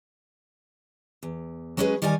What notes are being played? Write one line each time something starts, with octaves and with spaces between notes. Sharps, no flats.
E2
F#3 G#3 C#4 G4 G#4 B4
D#3 G3 A#4 D5 D#5 G#5